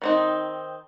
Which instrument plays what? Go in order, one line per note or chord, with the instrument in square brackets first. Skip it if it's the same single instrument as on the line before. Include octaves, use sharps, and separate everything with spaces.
[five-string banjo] D#3 C4 D#4